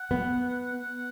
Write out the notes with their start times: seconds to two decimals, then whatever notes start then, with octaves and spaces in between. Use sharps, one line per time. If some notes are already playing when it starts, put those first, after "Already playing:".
Already playing: F#5
0.11 B3